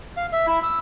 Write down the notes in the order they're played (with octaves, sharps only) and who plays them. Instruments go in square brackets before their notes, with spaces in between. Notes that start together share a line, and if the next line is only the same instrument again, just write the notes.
[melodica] F5
E5
E4
E6